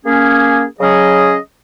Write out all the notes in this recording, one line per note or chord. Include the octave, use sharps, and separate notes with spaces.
A#3 C#4 G#4
C#3 F#3 C#4 G#4 D#5